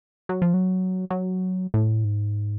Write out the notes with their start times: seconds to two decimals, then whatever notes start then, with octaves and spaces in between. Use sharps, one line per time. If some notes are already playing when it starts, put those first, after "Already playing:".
0.29 F#3
0.42 F3
0.54 F#3
1.10 F#3
1.74 A2
2.04 G#2